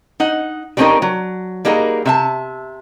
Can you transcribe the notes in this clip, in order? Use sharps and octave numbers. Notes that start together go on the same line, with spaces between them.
D#4 F#5
G3 A3 C4 C#4 D#4 A#4
F#3
G3 A#3 D#4 F#4 G#4 A#4
C3 E5 A5